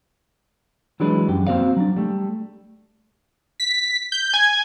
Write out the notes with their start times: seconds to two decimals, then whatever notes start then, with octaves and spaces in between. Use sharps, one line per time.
1.00 E3 F#3 G#3 D4 B4
1.28 F#2 G4
1.47 A#3 C4 F#4 C5 D5 F5
1.77 F#3 D4
1.97 G3 A3
3.60 B6
4.12 G6
4.34 G#5